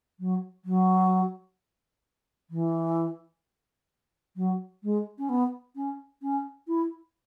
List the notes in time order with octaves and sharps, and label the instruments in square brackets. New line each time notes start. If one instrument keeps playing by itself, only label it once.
[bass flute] F#3
F#3
E3
F#3
G#3
C#4
B3
C#4
C#4
E4